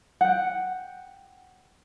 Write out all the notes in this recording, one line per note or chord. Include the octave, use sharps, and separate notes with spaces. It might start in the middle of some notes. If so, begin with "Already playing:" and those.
F#5 G5